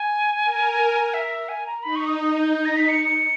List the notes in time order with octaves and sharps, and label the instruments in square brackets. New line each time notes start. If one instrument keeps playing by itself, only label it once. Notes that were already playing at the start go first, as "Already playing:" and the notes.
Already playing: [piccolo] G#5
[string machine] A#4
[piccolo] E5
G#5
A#5
[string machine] D#4 [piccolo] B5
[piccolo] C#6
D#6
D#6
G6
G6
A#6
B6
C#7
C#7